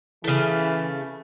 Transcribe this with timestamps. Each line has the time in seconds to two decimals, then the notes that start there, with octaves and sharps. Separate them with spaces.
0.24 C#3 E3 A3